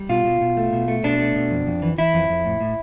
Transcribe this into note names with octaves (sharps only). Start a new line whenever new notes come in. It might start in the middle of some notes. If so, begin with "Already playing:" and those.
Already playing: G3
B2 F4
B2
B2
A3
B2
A3
B2 D4
A3
B2
F2
F2
E3
E3 E4
F2
F2
A2
A2